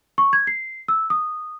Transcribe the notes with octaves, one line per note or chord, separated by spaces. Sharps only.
C#6
G#6
C7
E6
D#6